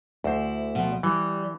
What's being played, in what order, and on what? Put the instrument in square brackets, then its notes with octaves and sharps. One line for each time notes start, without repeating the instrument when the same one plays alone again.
[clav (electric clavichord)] D2 C5 [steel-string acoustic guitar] E4
[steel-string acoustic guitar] B2 F3
[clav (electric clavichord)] E3 [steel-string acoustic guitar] G3